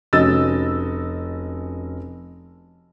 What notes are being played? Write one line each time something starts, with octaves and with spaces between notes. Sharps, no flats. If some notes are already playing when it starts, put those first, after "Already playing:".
F1 C#4 F#4 D#5 E6 A6